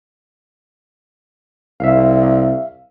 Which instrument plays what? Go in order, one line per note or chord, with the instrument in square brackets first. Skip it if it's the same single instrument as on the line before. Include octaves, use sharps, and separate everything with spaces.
[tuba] C2 [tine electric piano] E5 F5